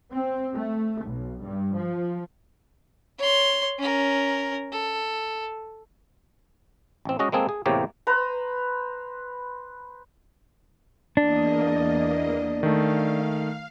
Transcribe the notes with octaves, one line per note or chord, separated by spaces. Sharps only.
C4
A3
B1
G2
F3
C#5 C6
C#4 A#4
A4
A1 C4
G#3 C#4 F#4 D#5
G#3 A#3 C4 G#4 A4
G#4
E2 A2 C3 A#3 G4 C#5
B4 C5 A#5
E2 A#3 D4 D#5
D#3 A3 F5